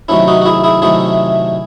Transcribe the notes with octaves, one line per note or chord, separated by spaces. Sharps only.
C3 D#3 F#3 A3 C#4 E4
D#4 F#4
F#4
E4 G#4
E4 G#4
C3 D#3 F#3 A3 E4 G#4